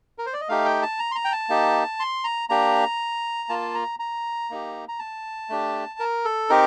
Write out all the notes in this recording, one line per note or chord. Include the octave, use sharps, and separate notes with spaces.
A#4
C5
D5
D#5
A3 D#4 G4 F5
G5
A5
A#5
C6
A#5
G5
A5
A#3 D#4 G4
C6
A#5
A#3 D4 G4 A#5
A#3 F4 A5
A#5
A#5
A#3 D#4 G4
A#5
A5
A3 D4 G4
A#4
A4
C4 D#4 G4 A#4